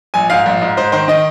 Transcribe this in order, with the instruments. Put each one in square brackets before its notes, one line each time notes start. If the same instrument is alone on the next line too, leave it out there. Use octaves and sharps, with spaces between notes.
[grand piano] A#1 G#5
G#2 F5
A#1
G#2
G#2 C5
D#3 C5
D#3 D#5